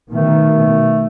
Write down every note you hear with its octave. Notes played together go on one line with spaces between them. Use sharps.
B2 D#3 A3